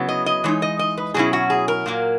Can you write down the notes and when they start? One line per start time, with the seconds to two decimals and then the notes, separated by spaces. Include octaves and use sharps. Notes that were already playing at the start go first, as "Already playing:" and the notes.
Already playing: C#3 F#3 B3 E4
0.09 D#5
0.26 D#5
0.44 E3 G#3 D#4 C#5
0.62 D#5
0.79 D#5
0.98 B4
1.14 B2 F#3 C#4 E4 G#4
1.33 F#4
1.50 G#4
1.68 A#4
1.86 A#2 F#3 A#3